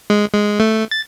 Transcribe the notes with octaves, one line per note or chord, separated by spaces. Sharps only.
G#3
G#3
A3
A6